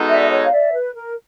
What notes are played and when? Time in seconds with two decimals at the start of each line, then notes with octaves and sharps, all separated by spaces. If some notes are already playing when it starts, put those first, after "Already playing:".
Already playing: G#3 B3 D#4 F#4 A4
0.08 D5 E5
0.30 C#5 D#5
0.43 F5
0.51 D5 E5
0.73 B4
0.95 A#4